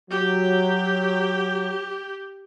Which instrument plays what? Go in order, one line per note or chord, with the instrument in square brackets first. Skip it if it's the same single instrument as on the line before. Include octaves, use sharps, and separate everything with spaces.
[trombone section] F#3 [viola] G4